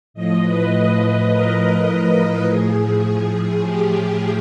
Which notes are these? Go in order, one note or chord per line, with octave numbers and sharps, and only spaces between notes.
A2 F3 D#5
B4
A#4
A2 F3 G#4
G4